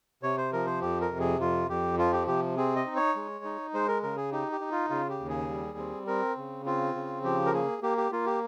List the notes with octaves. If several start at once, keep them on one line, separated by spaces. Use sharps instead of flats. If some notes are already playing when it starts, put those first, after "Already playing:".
C3 C#5
C5
F3 A#4
C5
F2 G4
A#4
C3
G#4
F2 F4
F2 G4
F3 F4
G4
C3 G4
C4 G#4
D#5
D#4
C#5
G#3
D#4
G#3 C5
A#4
C#3 A#4
G#4
D#4 G4
G4
D#4
F4
C#3 F4
G4
D#2
G#4
G3
C4
C4 A#4
C#3
C4 F4
C#3
F3 G4
A#4
A#3 G#4
A#3 G4
G4
A#3 F4
G4